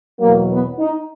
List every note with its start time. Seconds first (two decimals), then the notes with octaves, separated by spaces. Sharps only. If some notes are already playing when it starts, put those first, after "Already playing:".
0.20 E2 B2 F#3 A#3
0.50 B3
0.79 D#4